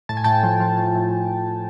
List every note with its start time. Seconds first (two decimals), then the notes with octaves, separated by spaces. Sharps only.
0.09 A2 A5
0.17 G#5
0.24 A2 G5 A5
0.43 F3
0.60 F3
0.78 A2
0.95 A2